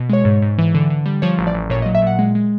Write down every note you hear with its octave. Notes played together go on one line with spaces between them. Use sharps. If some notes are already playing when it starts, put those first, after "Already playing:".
Already playing: B2
G#3 C#5
G#2
G#2
E3
D3
D3
G3
F3 C#5
A1
D5
A1
A#2 C#5
D#5
F#3
E5
A#2 F#5
G#3
G#3